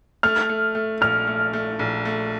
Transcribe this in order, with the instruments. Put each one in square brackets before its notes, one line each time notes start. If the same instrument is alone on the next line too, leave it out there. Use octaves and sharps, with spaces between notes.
[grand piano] A3 [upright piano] F6
[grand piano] A3
A3
[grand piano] A#1 [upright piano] F6
[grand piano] A3
A3
A#1
A3